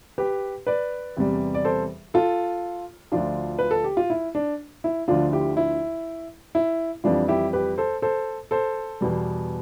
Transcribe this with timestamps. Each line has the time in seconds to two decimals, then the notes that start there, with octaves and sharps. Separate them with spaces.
0.18 G4 B4
0.67 B4 D5
1.17 E2 C3 G3
1.54 D5
1.65 A4 C5
2.14 F4 A4
3.12 D2 D3 F3 D4 F4
3.59 B4
3.71 A4
3.84 G4
3.97 F4
4.10 E4
4.35 D4
4.84 E4
5.08 D2 D3 F3 D4 F4
5.32 E4 G4
5.57 E4
6.55 E4
7.04 F2 E3 G3 D4 F4
7.28 E4 G4
7.53 G4 B4
7.78 A4 C5
8.02 A4 C5
8.51 A4 C5
9.01 E2 B2 G3